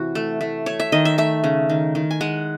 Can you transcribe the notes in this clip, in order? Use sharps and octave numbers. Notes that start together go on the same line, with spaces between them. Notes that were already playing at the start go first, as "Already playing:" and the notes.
Already playing: C3 E3 F#4
A3
A3
A3 C#5
E5
D#3 D#5
E5
A3 E5
C#3
D#3
D#3
G#5
G#3 F#5